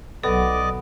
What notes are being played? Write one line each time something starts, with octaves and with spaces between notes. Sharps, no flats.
B1 B3 A4 D5 D#5 D6